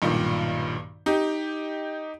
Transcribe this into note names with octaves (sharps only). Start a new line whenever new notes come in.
B1 G2 A#2 D#3
D#4 G4